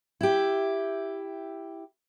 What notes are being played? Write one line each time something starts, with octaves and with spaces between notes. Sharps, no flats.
E4 G4